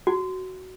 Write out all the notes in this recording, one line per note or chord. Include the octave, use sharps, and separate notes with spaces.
F#4